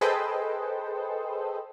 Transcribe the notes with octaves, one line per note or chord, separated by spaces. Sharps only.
G#4 A4 B4 C5 D#5 G5